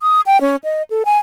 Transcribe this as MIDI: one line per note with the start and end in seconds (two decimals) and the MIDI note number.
0.02 0.21 87
0.26 0.40 79
0.41 0.56 61
0.64 0.82 75
0.90 1.03 69
1.05 1.18 80